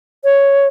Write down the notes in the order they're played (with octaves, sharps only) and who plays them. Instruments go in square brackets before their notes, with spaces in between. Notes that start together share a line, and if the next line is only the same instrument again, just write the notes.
[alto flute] C#5